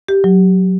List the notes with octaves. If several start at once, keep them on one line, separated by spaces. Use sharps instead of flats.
G4
F#3